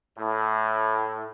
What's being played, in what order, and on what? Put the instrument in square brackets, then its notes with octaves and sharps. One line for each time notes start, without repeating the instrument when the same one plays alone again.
[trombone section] A2